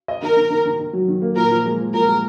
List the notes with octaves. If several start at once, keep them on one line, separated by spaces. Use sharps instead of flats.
D#5
D#3 A#4
D#3
D#3
D#3
D#3
F#3
D#3
A#3
A#2 A#4
F3
G#3
F3
A#2 A#4
G#3